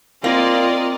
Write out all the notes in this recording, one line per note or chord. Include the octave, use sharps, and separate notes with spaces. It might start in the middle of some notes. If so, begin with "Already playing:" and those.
A#3 C4 F4 A#4 D5 D#5